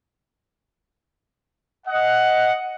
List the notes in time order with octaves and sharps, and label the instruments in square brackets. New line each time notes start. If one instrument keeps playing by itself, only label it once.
[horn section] D#5 F#5